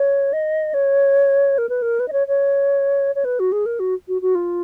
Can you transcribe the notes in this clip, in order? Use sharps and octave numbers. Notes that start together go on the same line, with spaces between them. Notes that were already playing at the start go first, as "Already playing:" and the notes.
Already playing: C#5
D#5
C#5
A#4
B4
A#4
B4
D#5
C#5
C#5
C#5
B4
F#4
G#4
A#4
F#4
F#4
F#4
F4